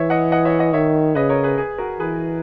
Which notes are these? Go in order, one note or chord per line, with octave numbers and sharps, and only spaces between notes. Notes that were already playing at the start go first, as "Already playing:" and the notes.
Already playing: E3 C#5 E5
D#5 F#5
D#5 F#5
C#5 E5
D#5 F#5
D#3 C#5 E5
C#3 B4 D#5
A#4 C#5
G#4 B4
G#4 B4
F#4 A#4
E3 G#4 B4